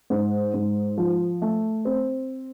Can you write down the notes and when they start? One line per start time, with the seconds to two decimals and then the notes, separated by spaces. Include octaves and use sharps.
0.10 G#2
0.54 G#2
0.98 F3
1.42 A3
1.85 C4